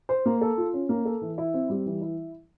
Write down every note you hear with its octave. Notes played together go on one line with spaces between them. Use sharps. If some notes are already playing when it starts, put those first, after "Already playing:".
C5
A#3
A4
F4
C#4
A#3
A4
E3
E4
C4
G3
E3
E4